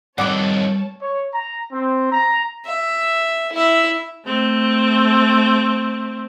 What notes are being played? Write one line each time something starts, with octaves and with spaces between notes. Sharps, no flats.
F2 D#3 G3 B4 C#5 D5 F#5 A5
C#5
A#5
C4
A#5
E5
E4 E5
A3 C4